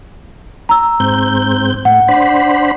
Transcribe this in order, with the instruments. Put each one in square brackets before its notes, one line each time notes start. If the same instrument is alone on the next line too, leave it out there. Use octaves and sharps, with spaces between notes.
[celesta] A#5 E6
[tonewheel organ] G#2 C4 G6
[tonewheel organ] A2 [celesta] F#5
[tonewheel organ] D4 C5 B5